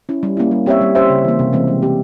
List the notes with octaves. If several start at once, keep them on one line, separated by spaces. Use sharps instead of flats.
C#4 E4
G3
A#3 C#4 E4
G3
C4 G4 C#5 E5
G3
C#4 G4 C5 E5
C#3
E3 A#3
C3
E3 G#3 C4
G3
C4 G4